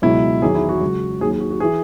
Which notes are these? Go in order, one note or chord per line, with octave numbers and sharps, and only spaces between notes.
C#2 B2 F#3 E4
E2 D#3 F#3 G#4
E4
F#4
C#2 C#3 F#3
D#2 D#3 F#3 G#4
G#4
F#4
F#4
E3 G#4